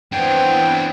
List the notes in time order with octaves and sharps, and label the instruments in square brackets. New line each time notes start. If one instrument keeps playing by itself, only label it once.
[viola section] E3 B3 C4 [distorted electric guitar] D4 C#5 [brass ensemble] C5 F#5 [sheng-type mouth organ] G5